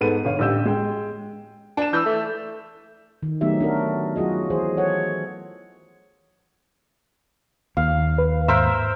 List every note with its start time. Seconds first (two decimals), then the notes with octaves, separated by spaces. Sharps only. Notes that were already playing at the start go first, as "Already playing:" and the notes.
0.01 G#2 B3 A4 B4 D#7
0.25 G1 C#5 F5
0.39 A1 D3 G4 E6 G6 E7
0.65 G#3 G5
1.77 D4 E7
1.93 E3 E6 G6
2.06 A3
3.23 D#3
3.41 F#3 A3 B3 D#4 G4 E5
3.61 D4 F#4 A#4
4.16 F#3 F4 F#4 G#4 D#5
4.50 E3 G#4 C5
4.77 A4 C#5 F#5
7.77 D#2 F5
8.18 B4
8.48 G#2 A#4 C5 E5